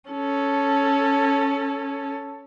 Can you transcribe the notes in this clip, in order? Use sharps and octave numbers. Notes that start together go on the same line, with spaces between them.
C#4 A4